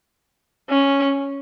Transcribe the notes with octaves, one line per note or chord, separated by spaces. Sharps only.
C#4